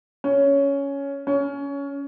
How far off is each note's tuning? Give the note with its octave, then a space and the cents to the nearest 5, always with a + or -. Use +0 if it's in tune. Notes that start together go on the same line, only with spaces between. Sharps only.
C#4 +10
C#4 +20